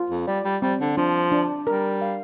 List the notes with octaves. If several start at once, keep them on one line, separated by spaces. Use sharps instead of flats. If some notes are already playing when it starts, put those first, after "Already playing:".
Already playing: F4
F2
G3 D5
G3
G3 C4
D3
F3 D4
D4
G3 A#4
F5